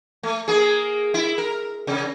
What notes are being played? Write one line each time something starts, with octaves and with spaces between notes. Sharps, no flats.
A3
A#3 G#4
E4
A#4
C3